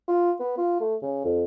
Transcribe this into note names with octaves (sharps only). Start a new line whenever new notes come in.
F4
B3
F4
A3
C#3
F2